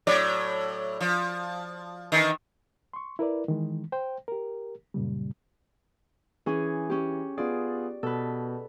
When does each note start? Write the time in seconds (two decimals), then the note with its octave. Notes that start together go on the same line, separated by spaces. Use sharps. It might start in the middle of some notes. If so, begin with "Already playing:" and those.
0.07 A2 F#3 D5
1.01 F3
2.12 D#3 E3
2.93 C6 C#6
3.19 E4 A#4 B4 D5
3.48 D#3 E3 G#3
3.92 C5 G5
4.28 G4 A#4
4.94 F#2 A#2 C#3 G3
6.46 E3 C#4 G#4
6.90 C#4 G4
7.38 B3 F4 G#4 D5
8.03 B2 A4 B4